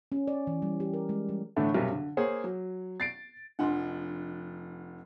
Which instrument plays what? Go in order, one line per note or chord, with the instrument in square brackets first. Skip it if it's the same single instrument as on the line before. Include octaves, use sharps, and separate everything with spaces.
[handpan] C#4
D5
E3
G3
G4
A#4
G#3
G3
[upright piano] A2 D3 E3 A3 D4
B1 F#2 C3 F#3 G3 A#4
D3
A#3 G#4 C5 C#5
F#3
A6 C7 D7
[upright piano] F1 F3 F#5 [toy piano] D4 D#5 C6